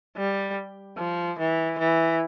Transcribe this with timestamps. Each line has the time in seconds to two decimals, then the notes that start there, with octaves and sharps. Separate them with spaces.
0.16 G3
0.97 F3
1.38 E3
1.78 E3